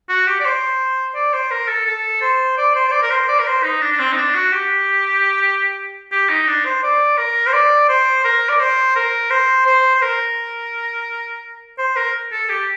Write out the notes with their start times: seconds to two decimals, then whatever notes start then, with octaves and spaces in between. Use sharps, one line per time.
0.09 F#4
0.27 G4
0.40 D5
0.45 C5
1.15 D5
1.33 C5
1.51 A#4
1.68 A4
1.86 A4
2.22 C5
2.58 D5
2.75 C5
2.88 C5
2.92 D5
3.02 A#4
3.10 C5
3.28 D5
3.39 A#4
3.46 C5
3.63 D#4
3.82 D4
3.92 D4
3.99 C4
4.12 D#4
4.17 D4
4.35 F#4
4.52 G4
6.12 G4
6.29 D#4
6.47 D4
6.65 C5
6.83 D5
7.18 A#4
7.46 C5
7.53 D5
7.89 C5
8.24 A#4
8.49 D5
8.60 C5
8.96 A#4
9.30 C5
9.66 C5
9.95 C5
10.02 A#4
11.78 C5
11.96 A#4
12.32 A4
12.49 G4